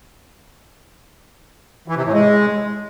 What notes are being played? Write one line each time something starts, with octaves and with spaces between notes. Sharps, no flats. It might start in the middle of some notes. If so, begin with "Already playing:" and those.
E3
C3
A2
G#3